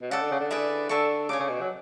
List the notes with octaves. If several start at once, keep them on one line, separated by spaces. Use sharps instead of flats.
B2
C#3 A4 D5 F#5
D3
C#3
D3
E4 G#4 B4 D5
D3 A4 E5 A5 C#6
C#3 C#5 G#5 D6
C#3
B2
F#3